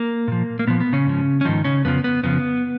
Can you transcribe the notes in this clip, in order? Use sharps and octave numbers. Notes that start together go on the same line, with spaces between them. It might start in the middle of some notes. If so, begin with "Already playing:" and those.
Already playing: A#3
A#2 F3
A#3
A#2 F3 B3
B3
C#3 C#4
G#2 F3
C#4
G#2 D#3 F3 D#4
C#3 C#4
F2 C#3 F3 B3
B3
F2 C#3 F3 B3